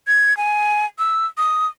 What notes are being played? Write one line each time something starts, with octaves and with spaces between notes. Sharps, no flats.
G#6
G#5
E6
D#6